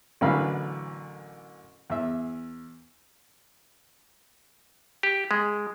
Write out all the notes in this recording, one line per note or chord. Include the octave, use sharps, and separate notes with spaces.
A1 F#2 D3 E3 F5 B5
E2 E5
G4
G#3